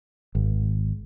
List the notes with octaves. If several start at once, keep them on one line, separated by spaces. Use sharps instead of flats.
G#1